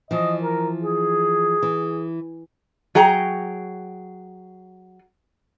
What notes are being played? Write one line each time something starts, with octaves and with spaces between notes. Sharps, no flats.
E3 F3 D#5
A#4
G#4
E3
F#3 G#4 G5 A#5